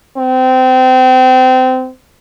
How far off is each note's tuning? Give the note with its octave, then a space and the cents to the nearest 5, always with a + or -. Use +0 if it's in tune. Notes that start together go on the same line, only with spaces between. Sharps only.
C4 -25